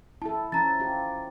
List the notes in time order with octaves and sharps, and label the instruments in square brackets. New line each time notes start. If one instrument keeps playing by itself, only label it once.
[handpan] E4 A4 [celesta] A5
[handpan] F3 C#4 [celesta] A#5 A6
[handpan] F4 G4